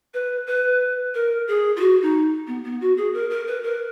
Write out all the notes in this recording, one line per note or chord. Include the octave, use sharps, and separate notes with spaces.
B4
B4
A#4
G#4
F4
F#4
D#4
B3
B3
F#4
G#4
A#4
A#4
B4
A#4